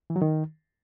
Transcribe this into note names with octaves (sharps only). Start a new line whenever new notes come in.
E3
F#3
D#3